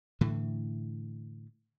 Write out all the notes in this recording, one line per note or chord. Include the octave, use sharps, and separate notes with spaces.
A2 D3 E3